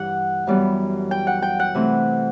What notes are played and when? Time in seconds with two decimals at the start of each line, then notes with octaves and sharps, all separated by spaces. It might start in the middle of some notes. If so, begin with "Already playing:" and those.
Already playing: G2 E3 F#5
0.47 F#2 E3 G3 B3
1.11 G5
1.27 F#5
1.42 G5
1.60 F#5
1.75 C3 E3 A3 C4